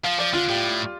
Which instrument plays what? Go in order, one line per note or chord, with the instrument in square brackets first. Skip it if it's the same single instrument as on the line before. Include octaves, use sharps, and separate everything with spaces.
[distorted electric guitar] F3 [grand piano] F5
[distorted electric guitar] F3 [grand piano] D5
[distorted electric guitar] D3 [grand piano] F4
[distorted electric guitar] A2 [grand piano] G4